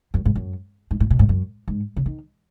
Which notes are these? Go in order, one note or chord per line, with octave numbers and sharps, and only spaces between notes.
F#2
G#2
F#2
G#2
A2
B2
G#2
F#2
G#2
C#3
D#3